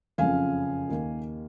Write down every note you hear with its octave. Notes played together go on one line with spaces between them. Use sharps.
F#1 F2 C#3 F3 F5 G#5
D#2 D#3 A#3